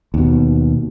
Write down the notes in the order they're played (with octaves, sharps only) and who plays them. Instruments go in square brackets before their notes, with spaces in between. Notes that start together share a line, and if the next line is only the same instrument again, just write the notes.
[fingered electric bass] D#2 B2